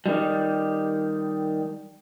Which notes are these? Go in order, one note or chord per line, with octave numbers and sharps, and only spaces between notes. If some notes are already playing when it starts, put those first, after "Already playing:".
D#3 G3